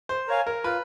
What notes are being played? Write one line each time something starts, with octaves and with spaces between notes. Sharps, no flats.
C5
A#4 C#5 F5 G#5
A#4
F4 B4